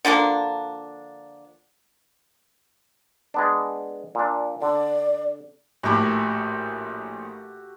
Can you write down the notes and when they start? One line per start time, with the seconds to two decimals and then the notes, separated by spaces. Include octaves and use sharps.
0.05 D3 F3 A#3 D4
3.34 G#3 B3 D4
4.15 A#2 D4
4.62 D3 D5
5.83 A#1 A2 F#4 G4 A4